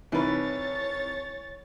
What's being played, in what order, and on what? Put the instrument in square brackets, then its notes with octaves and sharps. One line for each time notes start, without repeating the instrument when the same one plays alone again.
[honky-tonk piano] C2 D#4 [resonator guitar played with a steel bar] E3 B4 [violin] C#5 A6